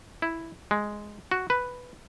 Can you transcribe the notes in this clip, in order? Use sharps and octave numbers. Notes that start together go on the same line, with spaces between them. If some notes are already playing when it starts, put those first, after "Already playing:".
E4
G#3
F#4
B4